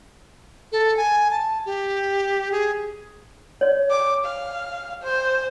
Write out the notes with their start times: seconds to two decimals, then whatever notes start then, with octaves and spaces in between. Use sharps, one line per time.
0.72 A4
0.97 G#5
1.31 A5
1.66 G4
2.52 G#4
3.61 C#5 D5
3.91 D6
4.25 F5
5.03 C5